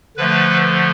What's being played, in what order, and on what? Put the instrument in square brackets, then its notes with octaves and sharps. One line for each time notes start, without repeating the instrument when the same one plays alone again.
[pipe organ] D3 F3 A3 B4